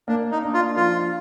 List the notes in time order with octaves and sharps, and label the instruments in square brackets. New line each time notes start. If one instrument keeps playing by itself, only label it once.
[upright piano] A#3 [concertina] D4
[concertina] D#4
[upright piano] D4
[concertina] F4
[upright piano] F3 [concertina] F4